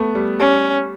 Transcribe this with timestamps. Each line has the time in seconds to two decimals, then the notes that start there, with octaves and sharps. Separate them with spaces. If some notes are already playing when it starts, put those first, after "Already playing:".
Already playing: A3 B3
0.15 G3
0.39 G3 C#4